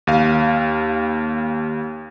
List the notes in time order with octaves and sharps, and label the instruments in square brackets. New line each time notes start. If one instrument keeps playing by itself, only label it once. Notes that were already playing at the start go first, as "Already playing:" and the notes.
[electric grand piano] D#2 F5